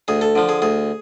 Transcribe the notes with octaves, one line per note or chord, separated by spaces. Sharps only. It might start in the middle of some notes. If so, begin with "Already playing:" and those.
D2 G#4
A4
D3 F3
G#4
D2 G#4